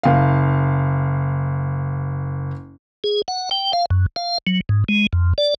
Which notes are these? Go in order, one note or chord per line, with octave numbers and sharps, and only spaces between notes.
F#1 F5
G#4
F#5
G5
F5
F#2
F5
F#3
G#2
G#3
F2
D5